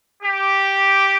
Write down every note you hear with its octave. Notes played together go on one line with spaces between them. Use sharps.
G4